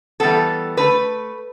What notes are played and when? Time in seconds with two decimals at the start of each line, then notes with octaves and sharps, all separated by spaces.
0.20 E3 G3 B3 A4
0.77 D3 A3 B4